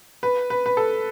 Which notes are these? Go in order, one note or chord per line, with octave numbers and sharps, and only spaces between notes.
B4
B4
B4
A4